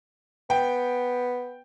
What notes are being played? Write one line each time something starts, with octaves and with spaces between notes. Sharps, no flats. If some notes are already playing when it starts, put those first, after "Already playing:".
B3 G5